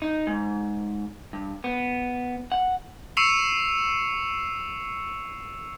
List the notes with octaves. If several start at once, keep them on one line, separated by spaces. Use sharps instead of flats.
D#4
G#2
G2
B3
F#5
C#6 E6 C7 C#7 E7 F7